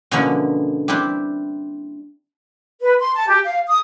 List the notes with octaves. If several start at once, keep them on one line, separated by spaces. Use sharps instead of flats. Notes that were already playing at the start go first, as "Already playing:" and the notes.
B2 D3 F3 A#3 C#4 E4
G3 C4 D4 E4 G4
B4
C6
A5
G4
F5
D#6